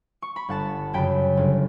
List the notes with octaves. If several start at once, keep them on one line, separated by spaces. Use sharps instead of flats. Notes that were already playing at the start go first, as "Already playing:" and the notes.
C#6
B5
G1 F#5 A5
F#2 C#3 G5 B5
G1